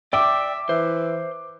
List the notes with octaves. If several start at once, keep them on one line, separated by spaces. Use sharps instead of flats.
D5 E5 G5 D6
E3 C5